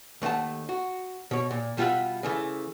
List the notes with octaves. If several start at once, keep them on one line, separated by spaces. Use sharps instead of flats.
D#2 A3 D#5 F#5 A5
F#4
B2 C#5
A#2
B2 G3 F4 A4 E5 F#5
C#3 E3 A3